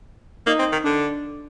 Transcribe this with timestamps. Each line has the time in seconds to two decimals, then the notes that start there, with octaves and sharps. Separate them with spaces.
0.47 A#3 D#4
0.59 C4
0.72 D#3
0.84 D3 D4